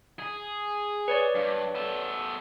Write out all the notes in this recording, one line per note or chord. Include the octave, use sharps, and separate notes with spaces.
G#4
B4 C#5 D5
G2
B3 A4